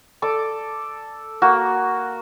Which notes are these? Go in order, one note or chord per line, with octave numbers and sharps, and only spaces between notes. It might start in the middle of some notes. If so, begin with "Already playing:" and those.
A4 D5 D6
A#3 F#4